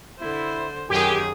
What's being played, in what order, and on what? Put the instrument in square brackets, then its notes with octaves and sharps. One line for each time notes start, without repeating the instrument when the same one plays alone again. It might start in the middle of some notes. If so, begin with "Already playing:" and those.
[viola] D3 C5 [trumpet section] E4
[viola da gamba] F#2 G#4 [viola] D#3 [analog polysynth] G4 [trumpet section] G#5